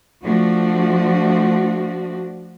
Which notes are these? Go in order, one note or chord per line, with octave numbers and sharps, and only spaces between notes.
F3 A3 D4 F#4